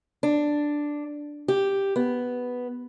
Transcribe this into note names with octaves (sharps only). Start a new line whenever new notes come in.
D4
G4
B3